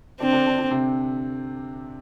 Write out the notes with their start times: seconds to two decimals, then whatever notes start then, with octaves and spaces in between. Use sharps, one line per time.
0.20 D3 C4 D4
0.32 D3 D4
0.46 D3 D4
0.58 D3 D4
0.71 C3 C4